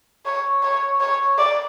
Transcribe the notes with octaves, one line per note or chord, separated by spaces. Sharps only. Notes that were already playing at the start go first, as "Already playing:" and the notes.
C#5
C#5
C#5
D5